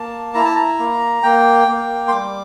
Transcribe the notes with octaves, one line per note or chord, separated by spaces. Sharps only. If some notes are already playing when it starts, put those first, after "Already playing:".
Already playing: A#3 A5
E4 A#5
A5
A#5
A#3
A#3 G5
A#3
C6
G3 D6